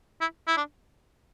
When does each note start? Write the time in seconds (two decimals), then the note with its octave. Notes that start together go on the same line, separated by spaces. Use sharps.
0.21 E4
0.47 E4
0.57 D4